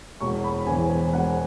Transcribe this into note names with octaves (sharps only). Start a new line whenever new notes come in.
E1 C#6
B5
E2 E3 G#5
G#5
E1 F#5